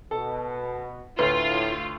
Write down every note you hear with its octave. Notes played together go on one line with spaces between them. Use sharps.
B2 A4
D2 A2 F4 B4